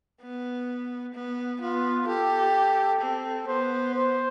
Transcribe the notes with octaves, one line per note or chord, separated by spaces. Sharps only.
B3
B3
B3 F4
G4 A4
C4
B3 C5
C5